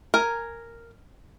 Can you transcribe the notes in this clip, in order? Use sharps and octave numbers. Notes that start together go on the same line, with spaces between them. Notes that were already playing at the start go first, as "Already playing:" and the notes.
A#4 G#5